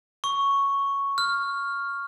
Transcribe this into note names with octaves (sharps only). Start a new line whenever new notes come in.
C#6
F6